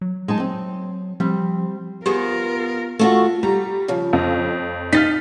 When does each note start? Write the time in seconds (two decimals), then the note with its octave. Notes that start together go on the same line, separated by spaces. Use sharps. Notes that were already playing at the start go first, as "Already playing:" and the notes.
0.01 F#3
0.28 G#3 D#4 A5
0.40 C4
1.20 F3 G3 C4
2.06 B3 F4 G4 G#4 A#4 C5
2.99 A3 F4 F#4
3.43 G3 A#5
3.88 C#3 F3
4.13 F2
4.93 D#4 F6 A6 B6